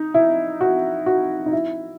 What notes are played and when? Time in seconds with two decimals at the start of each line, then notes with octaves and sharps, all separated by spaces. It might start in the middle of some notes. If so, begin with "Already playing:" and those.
Already playing: D#4
0.14 E4
0.61 F#4
1.06 F#4
1.46 D#4
1.53 E4